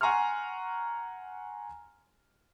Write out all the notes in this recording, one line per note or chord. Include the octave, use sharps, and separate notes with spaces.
F#5 G#5 A#5 C6 C#6 F6